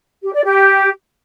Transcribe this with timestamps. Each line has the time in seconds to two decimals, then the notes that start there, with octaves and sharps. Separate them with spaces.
0.23 G4
0.33 D5
0.44 G4